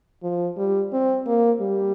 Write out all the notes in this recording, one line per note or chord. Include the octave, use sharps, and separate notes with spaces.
F3
G3
C4
A#3
G3